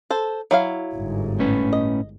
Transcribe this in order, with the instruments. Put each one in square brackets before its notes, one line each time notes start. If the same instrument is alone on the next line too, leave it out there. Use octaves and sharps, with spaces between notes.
[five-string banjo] A4 C5
F#3 E4 F5
[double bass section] G1 G#2
[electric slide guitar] A2 C#4 B4
[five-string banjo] D#5